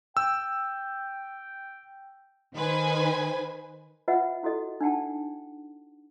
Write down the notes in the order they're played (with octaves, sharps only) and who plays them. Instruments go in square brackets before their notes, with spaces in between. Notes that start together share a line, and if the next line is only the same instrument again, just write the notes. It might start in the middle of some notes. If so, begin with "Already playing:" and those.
[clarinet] G5 [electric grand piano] E6
[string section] D#3 B4 C5 G#5
[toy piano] F4 B4 D#5 E5 F#5 G5
E4 F#4 A4 D#5
D4 D#4 F#5 G5 A5